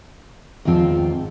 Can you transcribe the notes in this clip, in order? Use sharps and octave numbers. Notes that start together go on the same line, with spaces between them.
E2 G#2 D#3 F3 C4